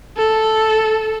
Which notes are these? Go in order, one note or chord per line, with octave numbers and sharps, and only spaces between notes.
A4